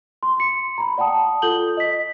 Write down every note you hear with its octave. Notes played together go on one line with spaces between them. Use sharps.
C6
C6 C#7
A#5 B5
D5 F#5 G5 A5 D#6
F4 A4 D#6 G6 F#7 G7
D#5 B6